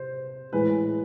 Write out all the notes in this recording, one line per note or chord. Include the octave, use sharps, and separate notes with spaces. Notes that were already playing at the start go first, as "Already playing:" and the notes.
Already playing: C3 C5
A2 E3 G#3 B4